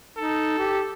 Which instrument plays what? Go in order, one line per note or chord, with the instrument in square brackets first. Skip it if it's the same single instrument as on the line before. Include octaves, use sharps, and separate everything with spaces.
[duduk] D#4 [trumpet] A4
[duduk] G4